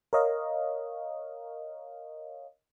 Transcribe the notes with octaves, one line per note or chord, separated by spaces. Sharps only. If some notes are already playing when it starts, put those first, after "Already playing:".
A#4 C#5 D#5 F5